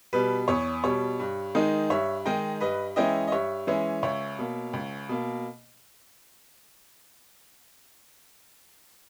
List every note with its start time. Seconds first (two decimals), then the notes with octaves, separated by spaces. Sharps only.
0.13 B2 G3 B4
0.48 E2 C#5
0.84 B2 G3 C#5
1.19 G2
1.55 D#3 G#3 D#4
1.90 G2 C#5 E5
2.25 D#3 G#3 D#4 D#5 G5
2.61 G2 B4 D#5
2.96 E3 G#3 C#4 E4 D#5 G5
3.28 D#5
3.32 G2 C#5 E5
3.67 E3 G#3 C#4 E4
4.03 C#2 C#5 E5
4.39 B2 A#3
4.73 C#2
5.09 B2 A#3